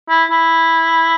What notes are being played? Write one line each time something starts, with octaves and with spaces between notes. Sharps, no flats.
E4
E4